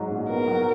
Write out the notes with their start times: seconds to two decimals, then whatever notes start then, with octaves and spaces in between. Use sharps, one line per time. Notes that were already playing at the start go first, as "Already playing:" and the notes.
Already playing: G#2 F#3
0.11 A#1
0.29 B3 A#4
0.48 F#3